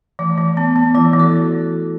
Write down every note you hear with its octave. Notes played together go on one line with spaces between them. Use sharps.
E3 A3
E3
B3
B3
E3 E4
E3
F#4 A4